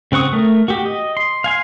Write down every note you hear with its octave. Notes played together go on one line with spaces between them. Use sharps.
C#3 C4 F#5 C#6 D#6
A3 A#4
F#4 G4
D#5
C6
F5 G#5 C6